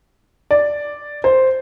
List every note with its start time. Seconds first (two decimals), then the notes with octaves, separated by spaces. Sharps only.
0.51 D5
1.24 C5